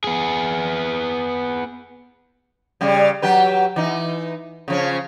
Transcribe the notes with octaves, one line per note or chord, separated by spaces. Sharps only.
B3 G#4
C#3 G3
F#3 G4 B4
E3 D#4
C#3 F3 C#4